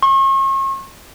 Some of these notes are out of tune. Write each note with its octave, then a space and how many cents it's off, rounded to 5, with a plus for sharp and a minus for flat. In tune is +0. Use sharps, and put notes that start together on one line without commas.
C#6 -40